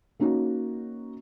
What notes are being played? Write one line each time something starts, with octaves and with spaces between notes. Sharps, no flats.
A#3 C#4 D#4 F#4